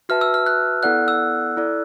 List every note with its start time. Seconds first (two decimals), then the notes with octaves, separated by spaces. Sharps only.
0.09 F#4 B4 E5 A5 F6
0.21 E6
0.34 F6
0.46 F#6
0.83 B3 E4 A4 D5 F#5 F#6
1.08 E6
1.57 E4 A4 D5